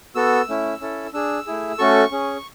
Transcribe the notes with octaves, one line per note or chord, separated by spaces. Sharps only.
B3 F#4 A4 E6
A3 C#4 E4
C#4 E4 A4
D4 G#4 E6
A3 E4 G#4
A3 C#4 F#4 A4 C#6
C#4 G#4